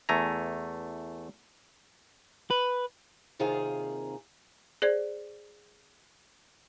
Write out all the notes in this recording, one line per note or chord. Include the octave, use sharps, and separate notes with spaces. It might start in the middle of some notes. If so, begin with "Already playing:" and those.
E2 A3 G#5 A#5
B4
D#2 C3 D#3 F4 G#4 F5
G#4 C5 D5 G#6